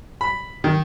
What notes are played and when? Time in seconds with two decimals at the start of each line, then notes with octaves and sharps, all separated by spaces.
0.21 B5
0.64 D#3